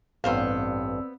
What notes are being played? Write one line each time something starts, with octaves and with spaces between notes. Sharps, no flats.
A1 G2 B3 C4 C5 D5 F5 E6